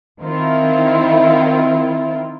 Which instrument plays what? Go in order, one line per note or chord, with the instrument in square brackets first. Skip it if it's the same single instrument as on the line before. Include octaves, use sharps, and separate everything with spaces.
[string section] D#3 C4 E4 F4